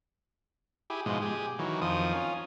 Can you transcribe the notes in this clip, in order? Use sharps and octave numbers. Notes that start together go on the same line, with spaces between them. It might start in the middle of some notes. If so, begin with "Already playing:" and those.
E4 G4 G#4
G#2 B2 F3 G#3
G4 G#4
D#3 E3 F#3
F2 D#3 F3 D#6
C#4 F4